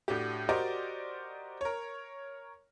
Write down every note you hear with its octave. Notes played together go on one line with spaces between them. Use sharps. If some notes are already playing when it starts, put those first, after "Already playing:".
A2 D4 F#4 G4
F#4 G4 A#4 C5 D5 D#5
A#4 C#5